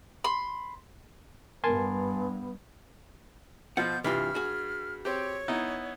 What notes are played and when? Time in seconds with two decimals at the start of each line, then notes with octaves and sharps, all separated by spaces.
0.24 B5 C6
1.64 G2 B3 A#4 G#5 A5 C6
3.77 B2 F3 F#5 G6
4.04 G2 C3 E3 F4 F6
4.35 F#4 G#4
5.05 C4 G4 C#5
5.48 B3 D#4 E4